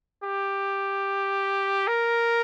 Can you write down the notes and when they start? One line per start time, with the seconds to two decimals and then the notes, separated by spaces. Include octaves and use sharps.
0.23 G4
1.87 A#4